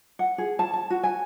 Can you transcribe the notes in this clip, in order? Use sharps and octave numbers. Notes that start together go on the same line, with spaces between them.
F#5
G#4
A5
A5
F#4
G#5